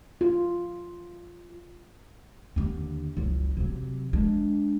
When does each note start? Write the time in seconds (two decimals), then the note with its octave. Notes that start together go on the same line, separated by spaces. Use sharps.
0.21 F4
2.56 D#2 D3
3.17 F#1 C#2
3.57 C3 F#3
4.13 G#3 D4